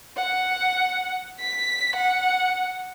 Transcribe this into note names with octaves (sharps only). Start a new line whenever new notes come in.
F#5
B6
F#5